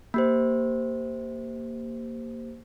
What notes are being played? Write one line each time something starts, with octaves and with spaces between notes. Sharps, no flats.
A#3 G4 C5